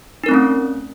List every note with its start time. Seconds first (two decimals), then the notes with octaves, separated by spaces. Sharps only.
0.24 D#4
0.26 A#4
0.29 C4
0.31 A3
0.34 C#4